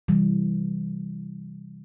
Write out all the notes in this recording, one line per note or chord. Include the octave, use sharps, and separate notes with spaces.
C3 E3 G3